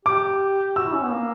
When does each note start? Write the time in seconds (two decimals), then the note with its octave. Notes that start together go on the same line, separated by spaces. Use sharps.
0.05 G4 D6
0.76 F#4 E6
0.86 E4
0.94 C#4
1.03 B3
1.12 A#3